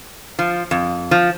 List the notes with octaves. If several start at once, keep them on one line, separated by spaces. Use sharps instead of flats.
F3
F2
F3